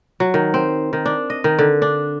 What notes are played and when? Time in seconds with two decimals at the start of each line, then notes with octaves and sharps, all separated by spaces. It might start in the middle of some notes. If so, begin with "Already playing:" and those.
0.20 F#3
0.34 D#3
0.54 C4
0.93 D#3
1.06 D4
1.30 D#5
1.44 D#3
1.59 D3
1.82 D4